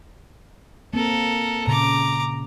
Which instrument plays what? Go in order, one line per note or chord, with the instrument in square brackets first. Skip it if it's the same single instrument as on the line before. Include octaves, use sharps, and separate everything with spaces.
[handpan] A#3 C4 [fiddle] A4 A#4
[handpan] A#2 C#3 [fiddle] A#5 D6